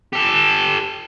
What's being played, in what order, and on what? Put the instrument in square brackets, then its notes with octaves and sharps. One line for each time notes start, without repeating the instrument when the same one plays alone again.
[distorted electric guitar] G4 A4